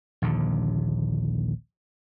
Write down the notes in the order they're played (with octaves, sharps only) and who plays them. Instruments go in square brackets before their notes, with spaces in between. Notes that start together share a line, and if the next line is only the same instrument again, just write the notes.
[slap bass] A#1 D#2 D3